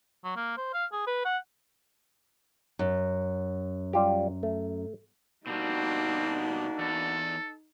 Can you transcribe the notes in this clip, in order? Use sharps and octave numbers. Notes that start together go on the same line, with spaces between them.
F#3
A#3
C5
F5
G#4
B4
F#5
F#2
G3 F4 G4
A3
B2 G3 A#3 C4 D4 D#4 F#4
E2 A4